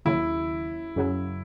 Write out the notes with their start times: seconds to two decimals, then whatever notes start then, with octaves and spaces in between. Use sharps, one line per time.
0.05 D#2 C#3 F#3 E4
0.96 F#2 C#3 F#3